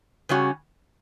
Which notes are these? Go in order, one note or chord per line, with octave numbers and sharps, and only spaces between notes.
C#3 G3 C#4 F#4